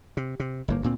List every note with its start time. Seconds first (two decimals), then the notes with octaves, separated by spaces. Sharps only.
0.17 C3
0.40 C3
0.68 G1 A2 A#3
0.82 D2 A#2 C4